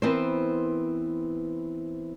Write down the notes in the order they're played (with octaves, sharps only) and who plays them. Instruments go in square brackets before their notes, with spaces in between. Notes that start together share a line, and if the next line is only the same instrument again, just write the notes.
[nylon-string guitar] E3 B3 C4 A#4 C5